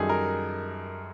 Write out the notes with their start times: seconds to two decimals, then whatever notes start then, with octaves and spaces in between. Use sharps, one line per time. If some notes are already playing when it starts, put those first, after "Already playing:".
Already playing: F#2 D#3 G3 G#4 A4
0.09 A#4